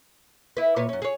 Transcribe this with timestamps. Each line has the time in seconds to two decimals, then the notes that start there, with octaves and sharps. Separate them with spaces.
0.57 E4 B4
0.76 A#2 B4 C#5
0.89 F#2 C#4
1.02 G#4 C#5